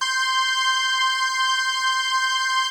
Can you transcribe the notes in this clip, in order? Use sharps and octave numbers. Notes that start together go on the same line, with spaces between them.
C6 G6